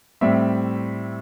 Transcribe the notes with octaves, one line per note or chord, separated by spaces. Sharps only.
A2 G3 C4 E5